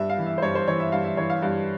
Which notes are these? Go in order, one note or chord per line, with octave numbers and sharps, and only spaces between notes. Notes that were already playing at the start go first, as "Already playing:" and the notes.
Already playing: G2 E5
F5
E3
E5
C5
G2 C#5
C5
E3 C#5
E5
G2 F5
E5
E3 C#5
F5
G2 F5